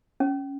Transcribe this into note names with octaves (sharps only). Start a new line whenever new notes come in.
C#4